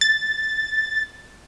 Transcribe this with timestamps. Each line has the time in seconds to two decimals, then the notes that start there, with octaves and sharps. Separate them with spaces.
0.01 A6